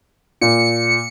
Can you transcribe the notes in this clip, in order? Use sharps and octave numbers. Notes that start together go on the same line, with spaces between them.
A#2 C#7